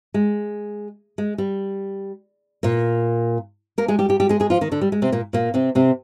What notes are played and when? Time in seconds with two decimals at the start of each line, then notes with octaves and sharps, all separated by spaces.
0.14 G#3
1.18 G#3
1.38 G3
2.63 A#2 A#3
3.78 A#3 A#4
3.88 G#3 G#4
3.99 G3 G4
4.09 G3 G4
4.20 G3 G4
4.29 G#3 G#4
4.40 G#3 G#4
4.50 F3 F4
4.61 D#3 D#4
4.71 D3 D4
4.81 G3
4.92 G#3
5.02 C3 C4
5.12 A#2 A#3
5.33 A#2 A#3
5.54 C3 C4
5.75 C3 C4